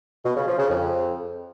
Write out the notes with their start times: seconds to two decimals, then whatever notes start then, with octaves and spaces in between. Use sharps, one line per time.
0.24 B2
0.35 C#3
0.46 F3
0.57 C#3
0.68 F2